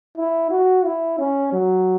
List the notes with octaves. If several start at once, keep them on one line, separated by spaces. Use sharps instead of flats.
E4
F#4
E4
C#4
F#3